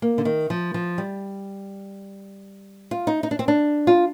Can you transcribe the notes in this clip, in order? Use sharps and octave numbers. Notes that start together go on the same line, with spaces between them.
A#3
D3
D#3
F3
F3
G3
F4
D#4
D#4
D4
C4
D4
F4